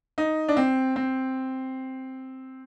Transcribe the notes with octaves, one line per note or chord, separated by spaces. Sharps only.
D#4
D4
C4
C4